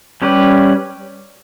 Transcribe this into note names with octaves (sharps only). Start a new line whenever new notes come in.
G3 C#4 G4 B4